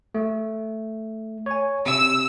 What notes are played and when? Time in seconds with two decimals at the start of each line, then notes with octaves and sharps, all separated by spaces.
0.14 A3
1.46 C#5 G#5
1.86 C3 E6